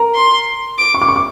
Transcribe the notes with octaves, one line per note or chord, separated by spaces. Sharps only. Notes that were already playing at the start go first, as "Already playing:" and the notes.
Already playing: A#4 A#5
C6
D6
C#6
D6
C#6
D6